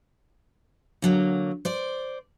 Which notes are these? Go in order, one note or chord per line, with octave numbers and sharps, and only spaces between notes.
D3 F#3 A#3
C5 D5